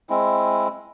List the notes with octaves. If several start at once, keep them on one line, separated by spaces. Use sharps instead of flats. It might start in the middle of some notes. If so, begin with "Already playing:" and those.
G#3 C4 E4